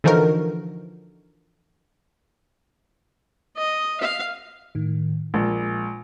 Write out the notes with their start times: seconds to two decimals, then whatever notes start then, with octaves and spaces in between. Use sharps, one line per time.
0.04 D3 E3 F3 D#4 F#4 A#4
3.58 D#5
4.01 F5
4.75 A2 D#3
5.34 A#1 G#3